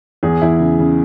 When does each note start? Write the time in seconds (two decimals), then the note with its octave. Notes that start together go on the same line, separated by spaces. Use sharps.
0.23 E2 G#4
0.42 E2 E4
0.60 C#3
0.79 C#3